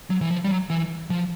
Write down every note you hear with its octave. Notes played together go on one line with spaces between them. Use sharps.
F#3
E3
F3
G3
F#3
E3
F3